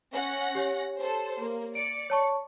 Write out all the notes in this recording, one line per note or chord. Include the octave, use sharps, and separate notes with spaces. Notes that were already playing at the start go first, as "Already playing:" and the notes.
C#4 F#5 A#6
G4 C#5
A4 C5
A#3
D5 C#7 D7
C#5 A5 C#6